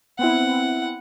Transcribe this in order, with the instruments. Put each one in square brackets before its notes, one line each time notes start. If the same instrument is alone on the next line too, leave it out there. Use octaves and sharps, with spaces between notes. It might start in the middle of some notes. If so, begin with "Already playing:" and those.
[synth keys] B3 C4 E4 [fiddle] F#5